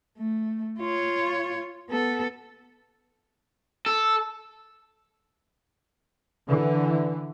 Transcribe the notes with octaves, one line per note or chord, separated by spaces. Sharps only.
A3
F4 C#5
B3 A4
A4
D3 E3